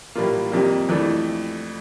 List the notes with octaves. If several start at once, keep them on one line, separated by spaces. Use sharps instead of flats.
A2 E3 G3 A#3 F4
F2 C3 G3 A#3
F2 E3 A3 D4